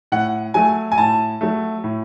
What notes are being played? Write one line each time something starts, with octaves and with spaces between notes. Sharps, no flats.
A2 F#5
F#3 A3 G#5
G#5
A2 A5
F#3 A3
A2